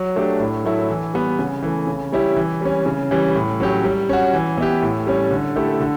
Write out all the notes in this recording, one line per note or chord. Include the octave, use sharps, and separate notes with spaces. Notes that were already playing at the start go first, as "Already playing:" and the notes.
Already playing: F#3
A3 D4 G4
A2
F#3 A3 E4
E3
G3 B3
C#3
E3 A3
C#3
G3 C#4 E4 G4
E3
G3 C#4
C#3
E3 G3 C#4
A2
F#3 C#4 G4
G3
C#4 F#4
E3
B3 E4 G4
A2
G3 C#4
D3
A3 E4 G4
D3